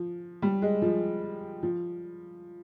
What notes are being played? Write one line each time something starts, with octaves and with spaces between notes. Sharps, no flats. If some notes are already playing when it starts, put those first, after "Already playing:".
Already playing: F3
G3
G#3
F3
F3